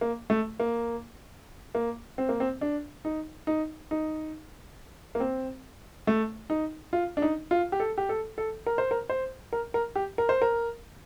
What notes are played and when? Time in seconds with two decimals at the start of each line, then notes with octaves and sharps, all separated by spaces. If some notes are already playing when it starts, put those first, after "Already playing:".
0.01 A#3
0.30 A3
0.60 A#3
1.75 A#3
2.18 C4
2.29 A#3
2.40 C4
2.61 D4
3.05 D#4
3.47 D#4
3.91 D#4
5.15 A#3
5.20 C4
6.07 A3
6.50 D#4
6.93 F4
7.17 D4
7.22 D#4
7.51 F4
7.72 G4
7.80 A4
7.98 G4
8.09 A4
8.38 A4
8.66 A#4
8.78 C5
8.91 A#4
9.09 C5
9.53 A#4
9.74 A#4
9.96 G4
10.18 A#4
10.29 C5
10.42 A#4